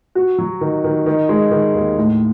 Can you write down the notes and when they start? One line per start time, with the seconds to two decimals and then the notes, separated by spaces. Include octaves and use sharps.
0.15 F#4
0.39 F#3
0.61 D#3
0.84 D#3
1.06 D#3
1.29 G#3
1.51 D#3
1.75 D#2
1.98 A2